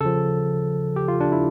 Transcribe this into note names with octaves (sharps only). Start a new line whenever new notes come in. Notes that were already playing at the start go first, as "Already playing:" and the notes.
C#3 F3 A4
G4
F4
D4
E4